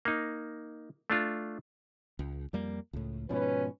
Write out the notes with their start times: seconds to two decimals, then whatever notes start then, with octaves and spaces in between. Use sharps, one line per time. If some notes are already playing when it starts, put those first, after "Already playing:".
0.05 A#3 D#4
1.10 A3 D4 F4
2.19 C#2
2.53 F2 G3 A#3
2.93 C#2 A2
3.29 G#2 B2 F3 C#4 B4